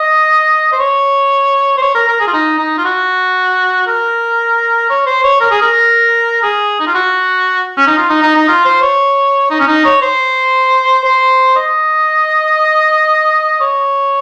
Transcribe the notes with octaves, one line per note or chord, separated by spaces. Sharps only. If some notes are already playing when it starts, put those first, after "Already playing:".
Already playing: D#5
C5
C#5
C5
C#5
A#4
A#4
G#4
F4
D#4
D#4
F4
F#4
A#4
C#5
C5
C#5
A#4
G#4
A#4
G#4
D#4
F4
F#4
C#4
D#4
F4
D#4
D#4
D#4
F4
C5
C#5
D#4
C#4
D#4
C#5
C5
C5
D#5
C#5